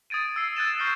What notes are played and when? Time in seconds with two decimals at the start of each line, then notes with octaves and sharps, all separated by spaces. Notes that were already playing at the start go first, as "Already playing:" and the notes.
0.10 D#6 G#6 A6 D7 D#7
0.36 E6 C7
0.56 E6 F#6 G#6 A6 D#7 E7
0.79 C#6 F6 G6 A#6 C7 D#7